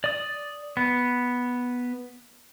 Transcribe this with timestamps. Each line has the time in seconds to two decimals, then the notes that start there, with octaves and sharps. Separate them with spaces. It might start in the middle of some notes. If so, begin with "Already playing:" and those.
0.04 D5 D#6
0.77 B3